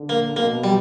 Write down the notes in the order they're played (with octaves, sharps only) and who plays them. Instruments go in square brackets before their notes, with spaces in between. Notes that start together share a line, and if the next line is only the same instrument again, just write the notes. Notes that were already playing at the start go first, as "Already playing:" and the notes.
Already playing: [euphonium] D3
[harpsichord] A#3
[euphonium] B2 [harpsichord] A#3
[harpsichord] G3